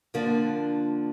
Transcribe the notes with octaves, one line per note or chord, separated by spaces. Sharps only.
D3 F3 A#3 D4